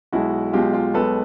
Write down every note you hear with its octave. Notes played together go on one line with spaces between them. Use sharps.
B1 B2 G#3 E4 F#4
B1 B2 G#3 F4 G4
F4 G4
B1 B2 G#3 A4 B4